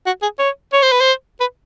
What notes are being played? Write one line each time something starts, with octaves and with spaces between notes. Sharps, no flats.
F#4
G#4
C#5
C#5
C5
B4
C5
B4